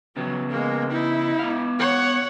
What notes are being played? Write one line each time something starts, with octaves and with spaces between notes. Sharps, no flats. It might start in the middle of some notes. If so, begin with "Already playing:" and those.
C#3 F#3 B3
G#3 A#3
D#4 E4
B3 F5
C#5 F#5